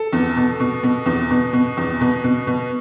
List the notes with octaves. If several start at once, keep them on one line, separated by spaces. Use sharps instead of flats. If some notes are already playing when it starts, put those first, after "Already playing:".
Already playing: A4
E2
B2
B2
B2
E2
B2
B2
E2
B2
B2
B2